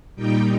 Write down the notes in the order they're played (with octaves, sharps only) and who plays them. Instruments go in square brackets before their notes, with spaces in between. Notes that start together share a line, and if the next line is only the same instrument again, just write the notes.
[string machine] A#2 G3 D#4 G5